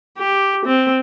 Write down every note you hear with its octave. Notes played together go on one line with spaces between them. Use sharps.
G4
C4